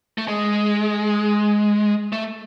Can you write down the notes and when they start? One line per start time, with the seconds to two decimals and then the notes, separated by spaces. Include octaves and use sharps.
0.18 A3
0.28 G#3
2.12 A3